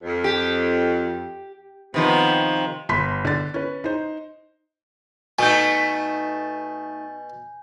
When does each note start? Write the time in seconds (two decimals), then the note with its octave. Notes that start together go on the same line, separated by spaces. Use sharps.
0.03 F2
0.24 G4
1.94 C3 D#3 F3 B3
2.89 G1 B5 C6 B6
3.25 D3 A6
3.54 C#4 B4
3.84 D#4 C5
5.39 B2 A3 D#4 G#5 G6